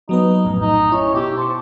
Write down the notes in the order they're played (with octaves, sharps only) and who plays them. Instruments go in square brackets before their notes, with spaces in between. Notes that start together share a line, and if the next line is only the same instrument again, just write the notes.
[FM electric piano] F#3 B3 B4 [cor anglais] D#4
[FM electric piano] A#1 F#2 A2
[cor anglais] D#4
[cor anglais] C#4 [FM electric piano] E4
[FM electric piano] B2 E4 E6 [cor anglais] G4
[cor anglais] C5 [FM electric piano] A5 C#6